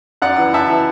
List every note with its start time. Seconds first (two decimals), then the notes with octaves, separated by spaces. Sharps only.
0.22 F#2 D5 F#5
0.38 E3
0.53 F#2 E5 A5
0.70 E3